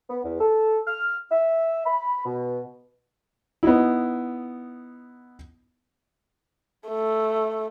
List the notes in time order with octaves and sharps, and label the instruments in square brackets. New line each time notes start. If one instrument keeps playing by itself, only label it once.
[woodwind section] B3
E2
A4
F6
E5
B5
B2
[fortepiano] B3 D#4 E4
[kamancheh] A3